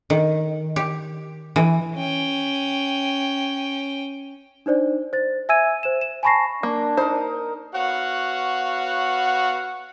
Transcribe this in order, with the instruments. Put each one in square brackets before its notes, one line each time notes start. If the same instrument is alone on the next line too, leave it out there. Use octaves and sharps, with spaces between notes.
[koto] D#3
G4
E3
[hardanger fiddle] C#4 G5
[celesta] D4 D#4 C5 D5
C5 A6
E5 G#5 E6 G#6 D#7
C5 E7
E7
G#5 A5 B5 C#6 A#6 C7
[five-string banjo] A#3 [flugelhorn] D4
[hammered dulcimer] D#4 A#4 [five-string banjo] C5
[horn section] B3 F#4 C#5 F5 F#5